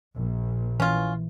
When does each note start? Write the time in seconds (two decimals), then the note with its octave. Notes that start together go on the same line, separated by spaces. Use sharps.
0.15 A#1
0.80 E3 C#4 F4